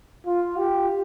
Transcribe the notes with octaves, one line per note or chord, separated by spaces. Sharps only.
F4
G4